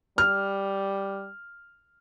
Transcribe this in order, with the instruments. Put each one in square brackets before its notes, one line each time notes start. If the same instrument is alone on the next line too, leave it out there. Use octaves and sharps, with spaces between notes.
[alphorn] G3 [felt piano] F6